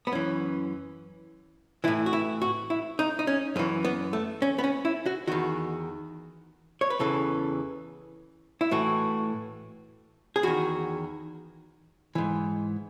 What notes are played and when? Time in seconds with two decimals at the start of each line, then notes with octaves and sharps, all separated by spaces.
0.07 B3
0.12 F#2 E3 C#4
1.84 A2 E3 E4
2.06 F#4
2.13 E4
2.42 F#4
2.70 E4
2.99 D#4
3.19 D#4
3.27 C#4
3.56 F#2 E3 C#4
3.85 B3
4.13 A3
4.42 C#4
4.58 B3
4.64 C#4
4.85 E4
5.06 F#4
5.28 E2 D#3 F#4
6.81 C#5
6.90 B4
6.99 E2 C#3 E3 A4
8.61 E4
8.71 A2 E3 F#4
10.36 G#4
10.43 E2 D#3 F#4
12.15 G#2 E3